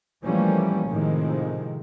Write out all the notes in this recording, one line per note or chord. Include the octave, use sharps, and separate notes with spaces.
E3 F3 G3 A3 A#3 C#4
A2 C3 D#3 F3 G#3